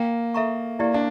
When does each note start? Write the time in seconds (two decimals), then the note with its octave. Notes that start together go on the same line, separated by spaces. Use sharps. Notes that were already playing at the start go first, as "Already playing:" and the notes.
Already playing: A#3 G5
0.34 A4 E5 A#5 C#6
0.79 A#3 E4 G4 D5
0.94 D4